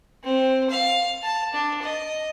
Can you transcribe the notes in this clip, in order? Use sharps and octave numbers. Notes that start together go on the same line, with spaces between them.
C4
F5
A5
D4
D#5